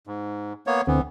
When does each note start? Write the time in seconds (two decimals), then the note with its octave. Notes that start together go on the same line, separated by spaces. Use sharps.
0.07 G#2
0.67 A#3 B3 C#5
0.87 D2 D3 E3 B3 C4